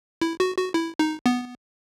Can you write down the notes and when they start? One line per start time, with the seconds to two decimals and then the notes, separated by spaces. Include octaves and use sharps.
0.22 E4
0.40 F#4
0.57 F#4
0.74 E4
0.99 D#4
1.26 B3